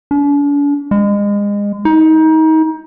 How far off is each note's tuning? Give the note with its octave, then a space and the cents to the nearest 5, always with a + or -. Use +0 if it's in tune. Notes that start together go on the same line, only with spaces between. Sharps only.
D4 -45
G#3 -30
D#4 +30